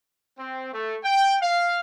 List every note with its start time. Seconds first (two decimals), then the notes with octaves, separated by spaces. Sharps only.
0.38 C4
0.73 A3
1.04 G5
1.42 F5